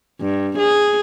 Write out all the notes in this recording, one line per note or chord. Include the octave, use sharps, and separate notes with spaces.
G2
G#4